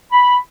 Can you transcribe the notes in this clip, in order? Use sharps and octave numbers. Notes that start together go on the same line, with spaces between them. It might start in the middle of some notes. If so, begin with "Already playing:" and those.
B5